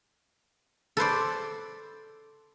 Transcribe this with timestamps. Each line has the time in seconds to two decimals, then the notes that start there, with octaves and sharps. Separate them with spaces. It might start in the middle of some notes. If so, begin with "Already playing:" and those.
0.97 A4 B4 C5 D5